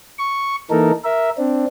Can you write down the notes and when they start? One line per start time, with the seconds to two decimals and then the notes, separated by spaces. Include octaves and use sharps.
0.18 C#6
0.71 E3 A#3 D#4 A4 A#4
1.04 A#4 E5
1.38 C4 D4